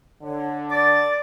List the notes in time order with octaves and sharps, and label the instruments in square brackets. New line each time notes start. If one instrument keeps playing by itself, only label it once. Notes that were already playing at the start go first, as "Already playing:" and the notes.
[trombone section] D3 [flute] C#5
[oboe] D5 [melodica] D6 [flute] A6